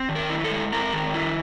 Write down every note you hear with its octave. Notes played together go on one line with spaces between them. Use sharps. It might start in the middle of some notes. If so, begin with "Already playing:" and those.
Already playing: C4
D#3
A#4
E4
A4
G#3
C4 A#4
D#3
E4